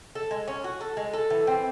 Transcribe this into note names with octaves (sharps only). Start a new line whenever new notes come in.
A4
G#3
C#4
F#4
A4
G#3
A4
E3
C4